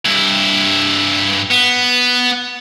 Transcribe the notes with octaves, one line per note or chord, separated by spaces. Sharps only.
G2 E4
B3